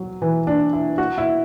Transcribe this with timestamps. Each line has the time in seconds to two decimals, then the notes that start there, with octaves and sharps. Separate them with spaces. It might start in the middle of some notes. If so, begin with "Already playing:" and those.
Already playing: F#3
0.22 E3
0.47 D4
0.73 E4
0.98 F#4
1.18 E4